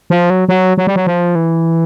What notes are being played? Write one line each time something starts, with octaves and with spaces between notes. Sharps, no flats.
F3
F#3
F#3
F#3
G3
F#3
F3
E3